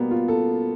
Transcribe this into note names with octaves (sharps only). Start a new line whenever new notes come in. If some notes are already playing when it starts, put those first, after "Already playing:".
Already playing: B2 G3 A#3 B3
F4
A4